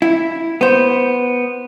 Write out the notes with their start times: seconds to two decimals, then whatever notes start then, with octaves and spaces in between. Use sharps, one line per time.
0.02 E4
0.61 B3 C5